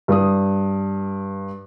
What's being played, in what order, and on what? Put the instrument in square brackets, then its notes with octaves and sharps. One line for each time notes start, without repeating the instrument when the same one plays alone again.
[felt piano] G2 D#6